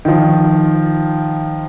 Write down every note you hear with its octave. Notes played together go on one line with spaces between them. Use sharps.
D#3 F3